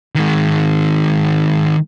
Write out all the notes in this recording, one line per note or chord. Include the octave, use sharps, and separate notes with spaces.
D#3 G#3